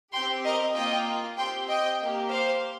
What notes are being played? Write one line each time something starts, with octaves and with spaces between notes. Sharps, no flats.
C4 G4 G5 C6
A#4 D#5
A#3 F4 D#5 G5
C4 G4 G5 C6
D#5 G5
A#3 G4
C5 F5